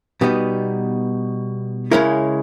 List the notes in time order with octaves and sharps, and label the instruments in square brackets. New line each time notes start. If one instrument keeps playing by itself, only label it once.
[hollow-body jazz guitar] B2 G3 B3 D#4
C#3 G#3 C#4 E4 A#4